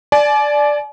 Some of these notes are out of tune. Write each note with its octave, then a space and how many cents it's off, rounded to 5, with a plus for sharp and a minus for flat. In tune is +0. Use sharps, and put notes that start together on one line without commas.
D5 +0 G#5 +45